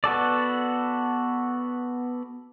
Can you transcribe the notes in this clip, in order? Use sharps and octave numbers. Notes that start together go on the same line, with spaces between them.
B3 F#4 A4 D5